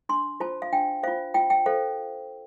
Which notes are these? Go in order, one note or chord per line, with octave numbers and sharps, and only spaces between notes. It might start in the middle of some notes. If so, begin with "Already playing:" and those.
D4 C6
F4 C5 A5
F5
D4 G5
F4 C5 F5
F4 G5
G5
A4 C5 F5